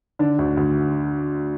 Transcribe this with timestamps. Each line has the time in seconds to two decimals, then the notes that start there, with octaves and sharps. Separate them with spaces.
0.19 D3 D4
0.39 D2
0.57 D2